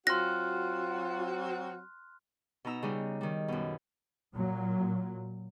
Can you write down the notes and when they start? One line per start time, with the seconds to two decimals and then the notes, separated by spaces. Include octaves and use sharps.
0.07 F#3 C4 F4 F#4 C6 F6 F#6 A#6
2.65 B2 D#4 A#5 E6
2.83 C#3 G3 D#4
3.21 D#3 G3
3.48 F#2 B2
4.34 A#2 F#3